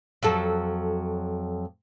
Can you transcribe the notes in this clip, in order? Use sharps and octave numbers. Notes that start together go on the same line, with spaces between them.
F2 F#3 A4